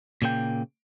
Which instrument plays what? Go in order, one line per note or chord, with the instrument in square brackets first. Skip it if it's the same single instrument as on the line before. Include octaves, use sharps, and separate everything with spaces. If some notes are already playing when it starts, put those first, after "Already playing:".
[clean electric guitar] A#2 C#3 A#3 A4 G5